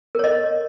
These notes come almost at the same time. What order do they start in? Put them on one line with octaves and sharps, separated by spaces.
A#4 C#5 D#5